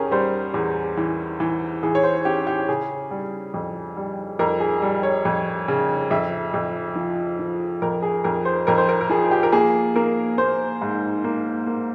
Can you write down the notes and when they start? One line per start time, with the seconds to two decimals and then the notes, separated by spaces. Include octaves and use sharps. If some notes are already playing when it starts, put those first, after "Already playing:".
Already playing: E2 C#4 G4 G#4 A#4
0.11 G3 C5
0.54 E2
0.97 E3
1.40 E3
1.83 E3 G#4
1.95 C#5
2.03 C5
2.25 C#4 G4
2.47 G4
2.69 C#3 G#4
3.11 G3
3.54 F2
3.97 G3
4.39 F2 A#4
4.60 G#4
4.82 G3
5.03 C#5
5.25 F2
5.68 C#3
6.11 F2 E5
6.54 F2
6.96 F3
7.39 F3
7.82 F2 A#4
8.03 G#4
8.24 F2 A#4
8.45 C5
8.67 F2 A#4
8.78 C5
8.89 A#4
9.01 A#4
9.09 F3 G#4
9.31 G4
9.43 A#4
9.52 A#3 G#4
9.96 A#3 A#4
10.38 A#3 C5
10.81 G#2
11.24 A#3
11.67 A#3